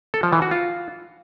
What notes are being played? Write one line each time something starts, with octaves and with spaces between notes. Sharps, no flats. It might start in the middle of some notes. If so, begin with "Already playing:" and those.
A4
F3
E3
F#4
F4